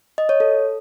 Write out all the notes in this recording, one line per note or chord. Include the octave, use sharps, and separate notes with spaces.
D#5
C#5
A4